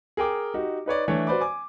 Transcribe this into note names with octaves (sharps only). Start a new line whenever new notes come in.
G#4 A#4 G5 D6
D#4 F#4 G4
D#4 B4 C#5 D5
E3 A3 D4 C#5
F#4 B4 C5 D5 B5 D6
G#5 D6